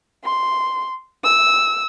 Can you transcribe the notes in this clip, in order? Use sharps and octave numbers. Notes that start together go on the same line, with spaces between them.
C6
E6